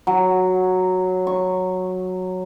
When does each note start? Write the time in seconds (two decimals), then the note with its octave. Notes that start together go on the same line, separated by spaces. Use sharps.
0.07 F#3
1.27 C#6